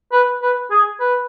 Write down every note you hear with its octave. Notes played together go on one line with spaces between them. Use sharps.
B4
B4
G#4
B4